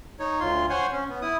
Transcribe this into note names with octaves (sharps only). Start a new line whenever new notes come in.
D#4 C#5
D2 F4 C6
C5 C#5 F#5 G#5 C6
C#4
B3
E4 D#6